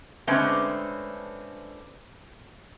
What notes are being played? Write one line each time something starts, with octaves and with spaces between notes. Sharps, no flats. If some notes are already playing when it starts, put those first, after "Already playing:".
D3 G#3 A3 C4 C#4 B4